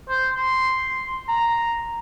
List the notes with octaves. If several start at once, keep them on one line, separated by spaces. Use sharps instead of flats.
C5
C6
A#5